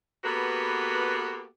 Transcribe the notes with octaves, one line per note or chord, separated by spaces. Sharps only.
A#3 B3 F#4 G4 A4 B4